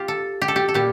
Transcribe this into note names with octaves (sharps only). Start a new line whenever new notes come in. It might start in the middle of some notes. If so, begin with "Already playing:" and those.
Already playing: F4 G4
A4
G4
A4
G4
A4
A#2 G3 G4